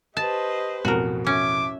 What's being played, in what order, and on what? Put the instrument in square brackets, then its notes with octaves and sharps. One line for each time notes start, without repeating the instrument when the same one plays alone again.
[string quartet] G4 B4 C5 [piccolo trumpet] D#5 [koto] A5
[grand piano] A1 F2 B2 [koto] F#4 A#4
[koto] C#4 [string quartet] E5 [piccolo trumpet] D6